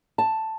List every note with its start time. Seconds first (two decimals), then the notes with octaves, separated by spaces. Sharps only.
0.18 A5